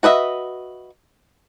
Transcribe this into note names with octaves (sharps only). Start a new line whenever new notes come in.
F#4 B4 D#5 E5